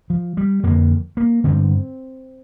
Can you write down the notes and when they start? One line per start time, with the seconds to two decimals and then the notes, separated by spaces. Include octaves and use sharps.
0.10 F3
0.37 G3
0.63 F2 D3 A#3
1.17 A#3
1.44 G2 D3 C4